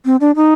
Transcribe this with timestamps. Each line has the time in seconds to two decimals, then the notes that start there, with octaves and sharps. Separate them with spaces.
0.05 C4
0.21 D4
0.36 D#4